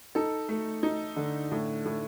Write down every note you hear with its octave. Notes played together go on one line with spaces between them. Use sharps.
D#4 A4
A3
D#4
D3
A2
A2